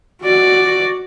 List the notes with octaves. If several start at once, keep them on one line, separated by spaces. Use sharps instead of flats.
F#4 D5